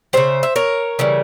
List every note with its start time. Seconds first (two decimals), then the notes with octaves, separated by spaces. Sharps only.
0.13 C#3 G3 C5 E5
0.43 E5
0.56 A#4 C#5
0.99 C#3 E3 G3